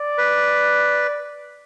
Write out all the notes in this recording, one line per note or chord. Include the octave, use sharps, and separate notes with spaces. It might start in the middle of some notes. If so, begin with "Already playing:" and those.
Already playing: D5
B4